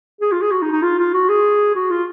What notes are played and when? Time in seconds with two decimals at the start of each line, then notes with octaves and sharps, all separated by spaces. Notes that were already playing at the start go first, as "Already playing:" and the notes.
0.21 G#4
0.32 F4
0.42 G#4
0.52 F#4
0.62 D#4
0.72 D#4
0.83 F4
0.99 F4
1.14 F#4
1.29 G#4
1.75 F#4
1.90 F4